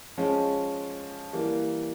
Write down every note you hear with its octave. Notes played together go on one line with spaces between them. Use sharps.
F3 G#3 C#4
E3 G3 A#3